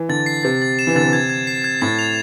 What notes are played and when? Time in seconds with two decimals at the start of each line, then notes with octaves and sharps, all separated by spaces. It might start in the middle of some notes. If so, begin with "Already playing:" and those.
Already playing: E3
0.09 D3 A6
0.26 C7
0.43 C3 A6
0.62 A6
0.79 E7
0.87 E3
0.95 D3 A6
1.04 C3
1.13 G#6
1.29 G#6
1.47 C7
1.64 G#6
1.81 A2 A6
1.99 F7